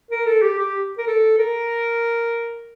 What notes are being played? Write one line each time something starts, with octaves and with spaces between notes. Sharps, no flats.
A#4
A4
G4
G4
A#4
A4
A#4